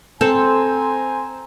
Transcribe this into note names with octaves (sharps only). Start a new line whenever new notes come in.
C4 A4 C5 G#5 A#5